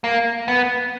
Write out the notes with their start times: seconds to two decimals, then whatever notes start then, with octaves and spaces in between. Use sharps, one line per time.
0.04 A#3
0.48 B3